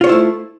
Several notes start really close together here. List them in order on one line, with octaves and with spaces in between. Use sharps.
F4 C#5 C5 E4 A3